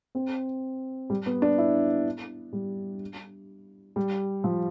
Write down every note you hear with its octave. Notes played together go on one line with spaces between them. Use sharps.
C4
G3
B3
D4
E4
G3
G3
F3